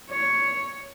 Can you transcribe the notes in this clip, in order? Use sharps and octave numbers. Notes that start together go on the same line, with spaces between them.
C#5